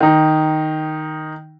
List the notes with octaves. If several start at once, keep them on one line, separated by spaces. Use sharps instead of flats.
D#3 D#4